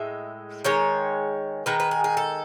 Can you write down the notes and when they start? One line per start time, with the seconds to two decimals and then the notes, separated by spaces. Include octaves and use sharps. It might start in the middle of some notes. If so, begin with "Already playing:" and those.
Already playing: A2 G#3 E5
0.65 D#3 G#3 C#5
1.66 D#3 G#3 B4
1.80 B4
1.91 G#4
2.04 G#4
2.17 A4